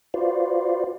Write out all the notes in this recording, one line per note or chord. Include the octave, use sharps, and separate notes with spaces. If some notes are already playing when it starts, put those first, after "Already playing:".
F4 F#4 B4 C5 D5 F5